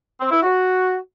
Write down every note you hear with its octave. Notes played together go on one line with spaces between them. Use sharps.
C4
E4
F#4